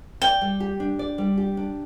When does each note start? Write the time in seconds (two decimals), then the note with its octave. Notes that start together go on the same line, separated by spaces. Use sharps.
0.22 D5 G5
0.41 G3
0.60 G4
0.80 D4
0.99 D5
1.18 G3
1.37 G4
1.57 D4